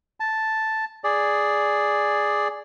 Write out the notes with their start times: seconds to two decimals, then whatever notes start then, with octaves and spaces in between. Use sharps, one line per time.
0.20 A5
1.04 G#4 D5